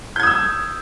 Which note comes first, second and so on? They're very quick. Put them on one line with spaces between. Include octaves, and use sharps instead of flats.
G6 G#6 D#6 E6